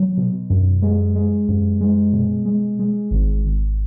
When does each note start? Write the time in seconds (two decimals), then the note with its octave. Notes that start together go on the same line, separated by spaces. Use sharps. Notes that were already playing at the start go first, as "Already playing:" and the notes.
Already playing: F#3
0.17 B2
0.50 F#2
0.82 G#3
1.16 G#3
1.48 F#2
1.81 G#3
2.13 B2
2.45 G#3
2.79 G#3
3.11 G#1
3.45 G#1